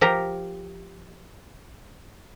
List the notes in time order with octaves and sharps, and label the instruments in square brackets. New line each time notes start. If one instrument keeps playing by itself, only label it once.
[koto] F3 G4 A#4 A#5